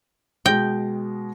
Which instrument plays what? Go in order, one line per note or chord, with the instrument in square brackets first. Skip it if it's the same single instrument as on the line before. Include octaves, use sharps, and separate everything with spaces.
[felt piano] B2 G#3 A#6 [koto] G5